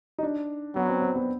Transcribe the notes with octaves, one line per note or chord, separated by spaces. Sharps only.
D#4
D4
F#3 B3
C4
C4
B3